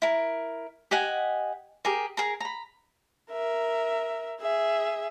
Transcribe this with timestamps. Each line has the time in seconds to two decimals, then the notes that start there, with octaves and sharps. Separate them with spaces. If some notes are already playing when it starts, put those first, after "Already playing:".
0.02 E4 A#4
0.91 G4 D#5 F#5 G#5
1.85 G4 G#4 A#4
2.17 G#4 A#4 A#5
2.40 A#5 B5
3.32 A#4 E5
4.41 G#4 E5